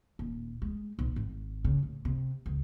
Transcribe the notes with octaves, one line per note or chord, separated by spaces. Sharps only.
D#1
G#3
B1
G#1
C#3
A2
C3
C#2